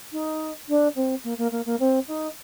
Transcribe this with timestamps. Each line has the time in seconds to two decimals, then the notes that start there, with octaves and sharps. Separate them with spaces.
0.12 D#4
0.68 D4
0.95 C4
1.24 A#3
1.38 A#3
1.51 A#3
1.66 A#3
1.80 C4
2.08 D#4